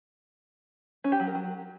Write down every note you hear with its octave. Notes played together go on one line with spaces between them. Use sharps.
C#4
G4
F#3
A#4
F#3